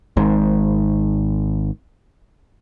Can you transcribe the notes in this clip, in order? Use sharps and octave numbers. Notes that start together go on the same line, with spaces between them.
G#1 G#2